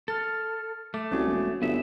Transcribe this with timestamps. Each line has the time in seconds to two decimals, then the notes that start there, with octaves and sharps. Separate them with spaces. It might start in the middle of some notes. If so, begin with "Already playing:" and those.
0.08 A4 F6 A6
0.94 A3 D6
1.11 C2 C#4 F#4
1.27 E1
1.62 G1 B3 E5